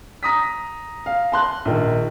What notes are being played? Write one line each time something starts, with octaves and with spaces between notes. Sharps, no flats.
A#5 D#6 B6
F5
A5 C6 F#6
A#1 D#3